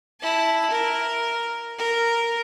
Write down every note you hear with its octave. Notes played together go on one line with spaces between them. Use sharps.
E4 A5
A#4
A#4